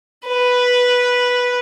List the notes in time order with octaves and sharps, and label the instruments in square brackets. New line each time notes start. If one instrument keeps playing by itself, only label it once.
[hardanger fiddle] B4